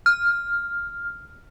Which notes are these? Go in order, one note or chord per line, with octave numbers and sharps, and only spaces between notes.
F6